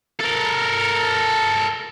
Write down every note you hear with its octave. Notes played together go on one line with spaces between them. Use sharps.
A4 A#4